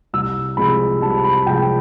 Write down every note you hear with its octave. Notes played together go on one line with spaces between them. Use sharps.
C2 E6
C3 F3 G#3 B5
C2 A5
B5
C3 F3 G#3 G5